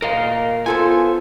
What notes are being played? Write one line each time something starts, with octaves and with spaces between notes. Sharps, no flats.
A#2 A#4 D#5 F5
B3 F4 A4 C5 G#5